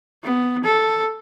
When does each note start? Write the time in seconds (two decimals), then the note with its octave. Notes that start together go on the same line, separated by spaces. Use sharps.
0.23 B3
0.64 A4